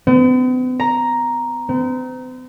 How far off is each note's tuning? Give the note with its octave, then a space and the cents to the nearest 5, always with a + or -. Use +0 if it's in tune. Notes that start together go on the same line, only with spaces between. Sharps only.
B3 +45
A#5 +5
C4 -45